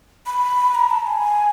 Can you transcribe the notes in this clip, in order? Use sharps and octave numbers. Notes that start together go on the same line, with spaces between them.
B5
A#5
A5
G#5